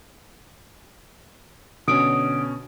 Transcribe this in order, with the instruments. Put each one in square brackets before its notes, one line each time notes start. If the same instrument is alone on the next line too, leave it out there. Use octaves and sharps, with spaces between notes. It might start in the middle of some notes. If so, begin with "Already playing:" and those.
[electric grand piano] B2 C#4 [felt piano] D3 [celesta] D#6 D7